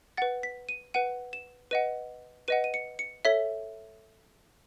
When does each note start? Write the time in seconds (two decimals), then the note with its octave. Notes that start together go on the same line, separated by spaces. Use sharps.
0.17 B4 F#5 A6
0.43 B6
0.69 D#7
0.94 B4 F#5 D#7
1.33 E7
1.71 B4 D#5 F#5 D#7
2.48 B4 D#5 F#5 D#7
2.64 D#7
2.74 C#7
2.99 C#7
3.25 A4 C#5 E5 B6